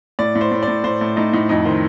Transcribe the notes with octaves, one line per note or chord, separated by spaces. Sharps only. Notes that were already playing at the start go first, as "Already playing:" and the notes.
A2 D5
A2
C5
A2
D5
A2
A2 C5
A2
A2 D#4
A2 D#4
F2 D#4
D#3 C5